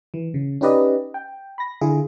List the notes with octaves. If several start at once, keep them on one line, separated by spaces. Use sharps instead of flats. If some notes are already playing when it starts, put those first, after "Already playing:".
E3
C#3
C#4 D#4 G4 B4 D5 D#5
G5
B5 A#6
D3 E4 F4 G#4